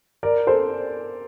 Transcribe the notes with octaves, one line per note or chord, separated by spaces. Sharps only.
A#4 D5
A4 C5